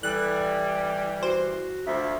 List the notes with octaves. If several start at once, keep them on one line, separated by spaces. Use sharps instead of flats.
E3 G3 A4 F#6
F#4 C5
D2 F3 E5